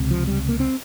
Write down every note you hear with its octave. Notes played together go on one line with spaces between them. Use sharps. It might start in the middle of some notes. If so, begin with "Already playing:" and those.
Already playing: C#2 C3
F3
G3
A#3
C4